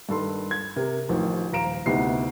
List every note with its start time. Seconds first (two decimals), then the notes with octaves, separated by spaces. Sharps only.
0.09 G2 D#3 A4 C6
0.51 G#6
0.76 C3 A#4
1.09 A1 D#3 F3
1.52 D#1 F5 A#5 D7 E7
1.86 D2 C3 B3 D#4 E4 C7